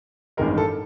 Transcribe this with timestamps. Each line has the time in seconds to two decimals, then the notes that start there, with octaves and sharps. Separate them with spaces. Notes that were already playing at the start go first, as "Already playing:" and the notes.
0.37 A1 G2 D#3 G#3 A#4
0.58 A4